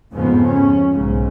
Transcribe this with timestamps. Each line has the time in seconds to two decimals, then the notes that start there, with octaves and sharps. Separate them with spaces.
0.12 F2 G#2 C#3 F3 B3
0.47 C#4
0.91 B1 G#2 C#3